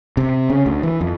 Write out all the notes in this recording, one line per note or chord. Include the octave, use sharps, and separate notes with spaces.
C3
C#3
D2
E3
F2